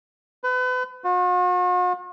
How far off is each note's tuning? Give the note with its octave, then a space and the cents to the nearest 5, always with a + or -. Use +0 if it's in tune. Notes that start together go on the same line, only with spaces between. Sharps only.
B4 +35
F#4 -45